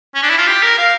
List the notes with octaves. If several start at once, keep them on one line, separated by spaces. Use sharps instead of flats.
C#4
D4
E4
F4
G4
A#4
F5